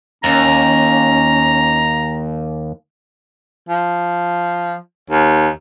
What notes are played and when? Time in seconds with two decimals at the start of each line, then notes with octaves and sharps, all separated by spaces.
0.24 D#2 C#4 A#5
3.69 F3
5.10 D#2